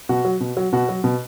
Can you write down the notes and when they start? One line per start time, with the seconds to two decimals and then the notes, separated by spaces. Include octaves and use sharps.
0.09 B2 F#4
0.25 F#3
0.40 B2
0.57 F#3
0.72 B2 F#4
0.89 F#3
1.04 B2